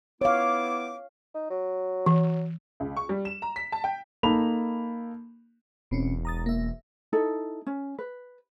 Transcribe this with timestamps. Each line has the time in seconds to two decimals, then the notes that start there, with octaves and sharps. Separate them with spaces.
0.21 B3 E4 C#5 F5 D6
1.34 D#4
1.50 F#3
2.06 E3
2.80 C#2
2.97 C#6
3.09 G3
3.25 E7
3.42 A#5
3.56 B6
3.72 A5
3.84 G5
4.23 A#3 D#4 A4 B5 F7
5.91 E1 B2 C4 C#4
6.25 A#5 D#6 A6
6.46 A#3 E5
7.13 D#4 E4 A4
7.67 C#4
7.99 B4